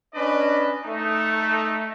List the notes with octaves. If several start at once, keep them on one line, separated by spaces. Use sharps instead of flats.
C#4 D4 B4 D5 D#5
A3 D#4